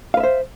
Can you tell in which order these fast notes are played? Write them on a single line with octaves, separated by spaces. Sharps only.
F5 B4 E5 C5